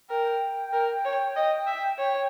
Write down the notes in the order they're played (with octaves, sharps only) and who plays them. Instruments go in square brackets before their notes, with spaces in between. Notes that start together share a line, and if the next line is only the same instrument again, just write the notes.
[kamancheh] A#4 [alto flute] G5
[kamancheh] A#4
C#5
D#5
E5
C#5